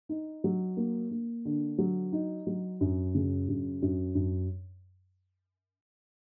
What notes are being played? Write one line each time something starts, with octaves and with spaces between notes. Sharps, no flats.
D#4
F#3
A#3
A#3
D3
F#3
D#4
F#3
F#2
C#3
F#2
F#2
F#2